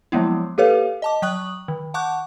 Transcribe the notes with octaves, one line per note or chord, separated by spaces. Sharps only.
F3 F#3 G#3 A#3 B3 E4
A#3 G4 A4 B4 C#5 F5
D#5 A5 D6
F#3 G5 C#6 D#6 F#6 F#7
D#3
F#5 A5 C#6 D6 F#6 G6